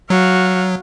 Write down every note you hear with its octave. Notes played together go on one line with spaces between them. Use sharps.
F#3 F#4 F5